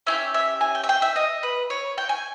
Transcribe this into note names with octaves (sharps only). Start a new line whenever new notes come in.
C#4 E4 G4 E5
E5
G#5
G5
E5
G5
E5
D#5
B4
C#5
G5
G#5